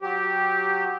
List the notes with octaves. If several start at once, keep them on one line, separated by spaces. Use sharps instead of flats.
F#3 G4